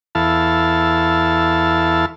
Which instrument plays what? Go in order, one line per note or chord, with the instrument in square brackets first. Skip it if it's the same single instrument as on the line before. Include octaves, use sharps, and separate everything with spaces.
[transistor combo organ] E2 E4 A4 F5 A5